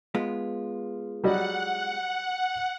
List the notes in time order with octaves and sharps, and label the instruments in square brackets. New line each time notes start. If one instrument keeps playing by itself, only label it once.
[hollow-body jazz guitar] G#3 B3 F4
[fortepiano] F#3 G3 D#5 [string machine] F#5